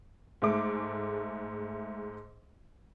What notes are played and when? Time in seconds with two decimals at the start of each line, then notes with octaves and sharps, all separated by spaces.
0.42 G#2 G#3 A3 D6